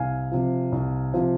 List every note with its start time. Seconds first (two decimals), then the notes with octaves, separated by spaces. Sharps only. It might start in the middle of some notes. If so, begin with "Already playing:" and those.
Already playing: C2 F5 G#5
0.32 C3 F3
0.72 C2
1.14 C3 F3